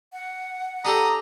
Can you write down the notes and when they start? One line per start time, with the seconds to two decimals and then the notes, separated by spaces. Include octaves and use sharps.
0.13 F#5
0.85 D4 G4 A4 A#5 D#6